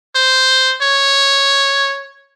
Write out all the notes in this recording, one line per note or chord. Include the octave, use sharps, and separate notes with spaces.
C5
C#5